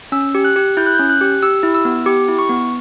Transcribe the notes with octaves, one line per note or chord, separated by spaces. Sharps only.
C#4 E6
G4
F#6
G4
E4 G6
F#6
C#4 G6
F#6
G4
G4 E6
E4
E6
B3
G4 D6
E4
C#6
B3